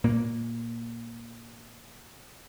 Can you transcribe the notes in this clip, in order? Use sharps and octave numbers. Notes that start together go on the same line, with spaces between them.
A#2 A#3